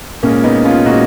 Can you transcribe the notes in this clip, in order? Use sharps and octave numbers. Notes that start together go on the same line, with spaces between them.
A#2 G#3 A#3 C#4
B3 D#4
C#4 F4
A#2 G#3 D#4 F#4